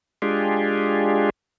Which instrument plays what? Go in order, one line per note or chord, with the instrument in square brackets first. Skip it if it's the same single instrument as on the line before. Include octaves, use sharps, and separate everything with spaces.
[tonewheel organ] G#3 D4 F4 G4 G#4